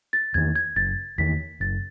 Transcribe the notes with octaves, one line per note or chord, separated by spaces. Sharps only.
A6
E2 D#3 G#6
G#6
F#1 A6
E2 D#3 B6
F#1 A6